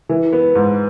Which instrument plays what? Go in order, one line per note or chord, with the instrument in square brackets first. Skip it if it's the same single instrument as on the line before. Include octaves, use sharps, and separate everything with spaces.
[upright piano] E3
B3
G#2